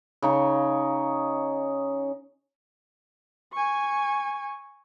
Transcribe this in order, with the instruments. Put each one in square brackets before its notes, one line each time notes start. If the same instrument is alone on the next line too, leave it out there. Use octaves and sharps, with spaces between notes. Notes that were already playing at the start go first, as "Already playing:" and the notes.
[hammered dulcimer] C#3 D#4 C#5
[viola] G#5 C#6